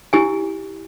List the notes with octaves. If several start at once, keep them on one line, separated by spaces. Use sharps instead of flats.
E4 G4 G#5